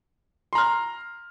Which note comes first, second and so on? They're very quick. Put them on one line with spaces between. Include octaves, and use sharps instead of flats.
C6 A#5 F6